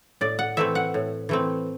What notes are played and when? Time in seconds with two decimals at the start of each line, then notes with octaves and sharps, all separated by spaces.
0.21 A2 D5
0.39 F#5
0.57 E3 A3 C4 E5
0.75 F#5
0.94 A2
1.29 E3 A3 C4